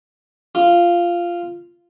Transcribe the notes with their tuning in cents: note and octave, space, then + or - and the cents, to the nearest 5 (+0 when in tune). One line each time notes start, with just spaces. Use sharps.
F4 -10